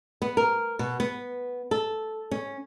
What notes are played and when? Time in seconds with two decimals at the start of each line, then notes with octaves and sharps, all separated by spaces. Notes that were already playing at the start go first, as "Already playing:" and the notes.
0.22 B3
0.37 A#4
0.79 B2
1.00 B3
1.71 A4
2.31 C#4